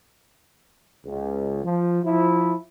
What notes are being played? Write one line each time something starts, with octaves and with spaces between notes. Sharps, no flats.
C#2
F3
F3 E4